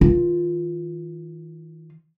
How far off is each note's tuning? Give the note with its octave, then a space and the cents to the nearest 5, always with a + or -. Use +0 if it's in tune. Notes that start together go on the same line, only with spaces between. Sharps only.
D#3 +45 F4 +0